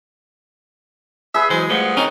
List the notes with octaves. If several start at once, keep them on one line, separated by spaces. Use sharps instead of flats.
G#4 B4 E5
E3 F#3 G#3 C5
F3 G3 A3 B3
D#3 C4 C#4 D#5 A#5